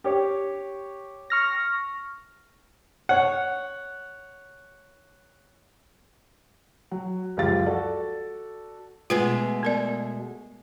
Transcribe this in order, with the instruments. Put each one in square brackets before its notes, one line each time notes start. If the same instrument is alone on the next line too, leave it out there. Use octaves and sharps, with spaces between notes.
[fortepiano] G4 C#5
[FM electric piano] C#6 F6 A#6
[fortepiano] C#5 F#5
[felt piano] F#3
C#2 F#2 F3 G4 F5 A6
F#4 A4 D5
[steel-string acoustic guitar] B2 G#3 A3 [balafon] F4 B4 G#5
[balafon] B3 A#4 D5